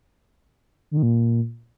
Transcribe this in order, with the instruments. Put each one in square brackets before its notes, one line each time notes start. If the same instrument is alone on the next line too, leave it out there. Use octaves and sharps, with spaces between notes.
[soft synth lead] D3
D#3
A#2